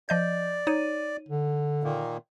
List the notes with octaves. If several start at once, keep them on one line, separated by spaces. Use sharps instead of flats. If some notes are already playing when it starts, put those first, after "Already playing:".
F3 D5 D#5 G6
D#4 C#5 D#7
D3
A#2 D#3 A#3